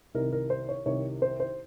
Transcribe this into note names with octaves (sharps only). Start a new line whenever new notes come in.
C2 C3 D#3 A#4
A#4
C5
C#5
C2 C3 D#3 C#5
C5
C5